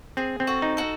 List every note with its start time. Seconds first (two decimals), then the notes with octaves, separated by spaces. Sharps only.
0.17 C4 G#4
0.40 C4
0.47 F#4 A4
0.62 D#4
0.77 F#4 A4